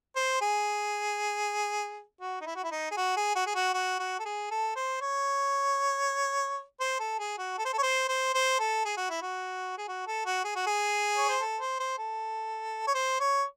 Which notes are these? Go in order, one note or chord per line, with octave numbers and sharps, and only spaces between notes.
C5
G#4
F#4
D#4
E4
F#4
E4
D#4
G#4
F#4
G#4
F#4
G#4
F#4
F#4
F#4
A4
G#4
A4
C5
C#5
C5
A4
G#4
F#4
A4
C5
A4
C#5
C5
C5
C5
A4
G#4
F#4
E4
F#4
G#4
F#4
A4
F#4
G#4
F#4
G#4
C#5
C5
A4
C5
C5
A4
C#5
C5
C#5